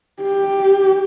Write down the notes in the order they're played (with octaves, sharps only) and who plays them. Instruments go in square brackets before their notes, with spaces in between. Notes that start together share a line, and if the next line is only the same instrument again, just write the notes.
[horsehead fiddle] G4